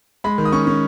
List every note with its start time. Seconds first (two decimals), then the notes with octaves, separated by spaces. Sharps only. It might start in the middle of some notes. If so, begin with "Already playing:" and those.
0.24 G#3 B5
0.38 D#3
0.45 D#6
0.52 C#4 C#6
0.67 C#4